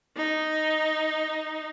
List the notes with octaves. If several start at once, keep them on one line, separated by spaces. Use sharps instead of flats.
D#4